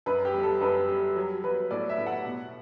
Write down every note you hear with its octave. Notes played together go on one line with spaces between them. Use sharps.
F#2 B4
G4
G3
A4
F#2 B4
G3
F#3
F#3 B4
A2 D5
E5
A2
F#5
B2